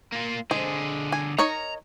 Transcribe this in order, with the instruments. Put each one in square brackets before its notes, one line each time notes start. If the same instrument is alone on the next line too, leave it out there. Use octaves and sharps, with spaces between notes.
[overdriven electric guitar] A#3 F4
[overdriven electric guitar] D3 G#4 [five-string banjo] G#3 C5
[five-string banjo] G#5
[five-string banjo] D#4 A#4 C#5 [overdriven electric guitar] A#5